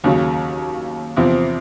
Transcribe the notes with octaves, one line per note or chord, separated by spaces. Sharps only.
D#2 C#3 F#3
E2 C3 F3